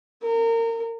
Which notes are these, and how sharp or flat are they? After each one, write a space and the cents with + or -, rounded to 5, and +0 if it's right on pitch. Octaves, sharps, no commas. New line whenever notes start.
A#4 -30